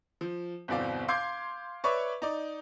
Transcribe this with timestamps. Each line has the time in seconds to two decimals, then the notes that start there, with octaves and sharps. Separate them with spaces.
0.21 F3
0.68 G1 E2 B2 C4 D5 F5
1.08 F5 C6 D6 G6 G#6 C7
1.84 B4 C#5 D5 E5 C#6 D6
2.22 D#4 D5